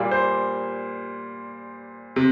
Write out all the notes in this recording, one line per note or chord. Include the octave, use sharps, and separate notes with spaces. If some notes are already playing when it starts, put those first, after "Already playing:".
Already playing: A#2 G3 A#3
C5
C3